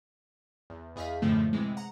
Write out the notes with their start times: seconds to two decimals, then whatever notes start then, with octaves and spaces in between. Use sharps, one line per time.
0.70 E2
0.96 E2 G#4 D#5 F5 B6
1.22 F#2 A2 D3 F3 A3
1.53 C3 E3 G#3
1.77 F#5 A#5